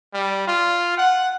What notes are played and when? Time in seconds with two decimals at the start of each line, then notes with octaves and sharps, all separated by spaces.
0.14 G3
0.47 F4
0.98 F#5